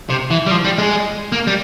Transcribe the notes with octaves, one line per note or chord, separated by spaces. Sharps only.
C3
E3
G3
F3
G3
G#3
A#3
G3